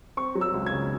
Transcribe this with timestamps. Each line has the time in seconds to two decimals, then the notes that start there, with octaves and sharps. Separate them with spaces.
0.17 C4 C#6
0.35 F#3
0.41 E6
0.54 C#2
0.66 G#6
0.73 C#3